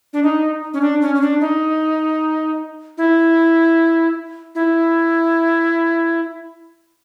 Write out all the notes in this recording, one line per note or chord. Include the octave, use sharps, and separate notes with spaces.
D4
D#4
C#4
D4
C#4
C#4
D4
D#4
E4
E4